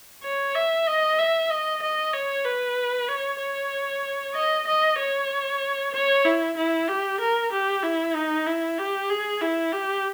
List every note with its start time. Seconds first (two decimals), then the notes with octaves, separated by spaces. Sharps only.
0.23 C#5
0.55 E5
0.87 D#5
1.18 E5
1.50 D#5
1.82 D#5
2.13 C#5
2.45 B4
3.08 C#5
3.40 C#5
4.34 D#5
4.67 D#5
4.98 C#5
5.93 C#5
6.25 E4
6.57 E4
6.88 G4
7.20 A#4
7.51 G4
7.83 E4
8.15 D#4
8.46 E4
8.78 G4
9.10 G#4
9.41 E4
9.73 G4